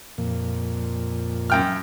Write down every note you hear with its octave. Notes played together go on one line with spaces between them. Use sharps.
F2 A#2
F#2 G5 F6